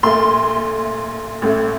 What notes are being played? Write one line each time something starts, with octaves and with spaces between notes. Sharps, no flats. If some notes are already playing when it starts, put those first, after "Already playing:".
A#1 A#2 A3 C6
A1 A2 A3